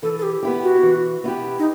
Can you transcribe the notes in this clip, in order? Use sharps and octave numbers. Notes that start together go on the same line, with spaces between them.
E3 A4
A4
G4
B3 E4 G4
F#4
E3
B3 E4 G4
D#4